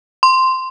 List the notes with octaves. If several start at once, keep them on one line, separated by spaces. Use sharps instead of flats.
C6